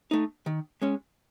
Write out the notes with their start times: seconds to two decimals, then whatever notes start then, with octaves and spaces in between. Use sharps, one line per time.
0.11 A3 D#4
0.46 D#3
0.82 G#3 C#4